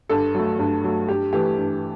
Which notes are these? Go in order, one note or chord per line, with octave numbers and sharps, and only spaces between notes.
G2 A4
F#3 A3
G2
F#3 A3
G2 G4
E3 A3 G4
G2